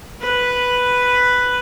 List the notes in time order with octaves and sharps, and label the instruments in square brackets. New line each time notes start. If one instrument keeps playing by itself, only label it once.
[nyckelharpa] B4